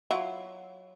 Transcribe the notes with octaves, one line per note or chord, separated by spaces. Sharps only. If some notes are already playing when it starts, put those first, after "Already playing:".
F#3 E4 F4